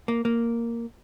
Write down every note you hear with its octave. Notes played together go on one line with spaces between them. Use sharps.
A#3
A#3